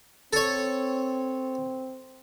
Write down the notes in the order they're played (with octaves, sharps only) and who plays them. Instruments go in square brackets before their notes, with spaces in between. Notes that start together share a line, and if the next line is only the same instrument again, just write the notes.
[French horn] C4 [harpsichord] A4 C#5